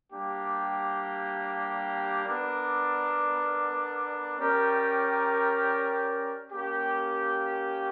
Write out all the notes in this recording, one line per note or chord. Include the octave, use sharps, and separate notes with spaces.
G3 A#3 D4 G4
B3 D4 A#4 D5
C#4 G4 A#4 D5 G5
A#3 C#4 G4